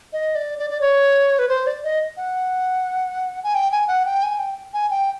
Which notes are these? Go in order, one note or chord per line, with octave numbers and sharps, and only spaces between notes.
D#5
D5
D5
D5
C#5
B4
C5
D5
D#5
F#5
G#5
G5
G#5
F#5
G5
G#5
G5
G#5
G5